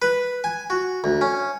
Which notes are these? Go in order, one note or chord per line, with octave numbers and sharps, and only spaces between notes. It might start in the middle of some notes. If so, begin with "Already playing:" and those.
B4
G#5
F#4
D2
C#4